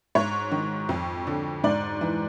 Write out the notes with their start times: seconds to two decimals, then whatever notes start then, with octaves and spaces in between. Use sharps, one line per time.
0.15 G#2 C#5
0.52 D#3
0.89 F2
1.27 D3
1.64 G#2 D5
2.01 E3